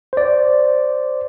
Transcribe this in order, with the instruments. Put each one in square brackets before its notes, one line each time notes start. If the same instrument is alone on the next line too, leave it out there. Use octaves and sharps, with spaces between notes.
[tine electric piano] C5 D5